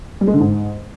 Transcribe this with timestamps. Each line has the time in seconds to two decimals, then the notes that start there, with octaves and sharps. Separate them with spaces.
0.21 G3
0.27 G#3
0.34 D3
0.40 G#2